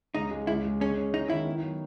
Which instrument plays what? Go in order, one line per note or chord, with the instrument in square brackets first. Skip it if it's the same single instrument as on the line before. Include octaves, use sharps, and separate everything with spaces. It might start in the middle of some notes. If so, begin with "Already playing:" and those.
[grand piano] C#2 [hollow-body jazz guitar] D#4
[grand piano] G#3
[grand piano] C#2 [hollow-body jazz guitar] E4
[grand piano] G#3
[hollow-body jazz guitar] C#4 [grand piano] G#4
[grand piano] C#4
[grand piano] G#3 [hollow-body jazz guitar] D#4
[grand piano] D#3 [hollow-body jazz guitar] E4
[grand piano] B3
F#3